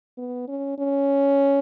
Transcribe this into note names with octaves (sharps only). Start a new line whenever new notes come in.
B3
C#4
C#4